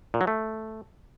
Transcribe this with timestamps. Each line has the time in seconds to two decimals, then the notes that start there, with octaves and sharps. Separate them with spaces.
0.14 A#2
0.21 F#3
0.27 A3